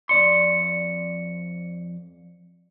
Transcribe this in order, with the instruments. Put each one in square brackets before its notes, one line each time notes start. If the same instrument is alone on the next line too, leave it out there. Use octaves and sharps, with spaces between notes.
[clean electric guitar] F2 D5 C6 [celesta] C#7